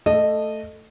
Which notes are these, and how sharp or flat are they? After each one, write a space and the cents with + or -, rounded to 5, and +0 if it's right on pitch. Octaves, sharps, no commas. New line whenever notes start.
A3 +5 A4 +0 D#5 -15